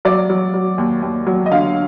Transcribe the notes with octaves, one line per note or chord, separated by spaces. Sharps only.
F#3 D5
F#3
F#3
D#2
D#2
F#3
D#5
D3 F5